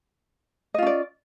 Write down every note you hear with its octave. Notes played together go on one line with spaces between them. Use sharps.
C#4 F4 D5 D#5